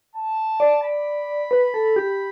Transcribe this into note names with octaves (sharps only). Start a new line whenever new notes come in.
A5
D5
B5
B4
A4
G4